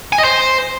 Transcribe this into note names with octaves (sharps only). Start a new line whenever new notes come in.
G#5
D#5
C5